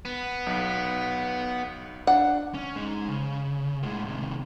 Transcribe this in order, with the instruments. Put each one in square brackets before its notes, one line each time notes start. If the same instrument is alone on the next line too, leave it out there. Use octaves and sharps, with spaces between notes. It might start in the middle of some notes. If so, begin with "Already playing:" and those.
[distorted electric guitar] B3
[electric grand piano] B1 B6
[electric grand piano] D4 [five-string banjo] F#5
[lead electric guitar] C#4
G#3 D#4
C#3
A2 G#3
C3 D#3